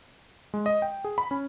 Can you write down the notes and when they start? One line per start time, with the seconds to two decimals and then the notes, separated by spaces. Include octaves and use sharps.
0.54 G#3
0.66 D#5
0.82 G5
1.04 G#4
1.18 B5
1.31 C#4